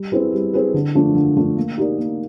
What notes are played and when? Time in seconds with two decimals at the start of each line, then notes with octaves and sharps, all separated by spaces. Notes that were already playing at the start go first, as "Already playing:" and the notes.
Already playing: G3
0.12 C4 E4 G#4 B4
0.33 G3
0.54 C4 E4 G#4 B4
0.74 D3
0.95 F3 A3 D4
1.15 D3
1.37 F3 A3 D4
1.57 A#3
1.77 D#4 G4 A#4 D5
1.98 A#3